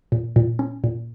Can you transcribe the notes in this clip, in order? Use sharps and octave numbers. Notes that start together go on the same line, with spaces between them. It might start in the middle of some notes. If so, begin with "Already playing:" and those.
A#2
A#2
C#4
A#2